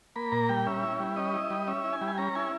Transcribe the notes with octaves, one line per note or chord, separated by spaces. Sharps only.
A#3 B5
A#2 A#5
G3 G5
C#4 E5
E4
G3
C#4 D#5
E4
G3
C#4 E5
E4
G#5
G3
G#5
C#4 A#5
E4 G#5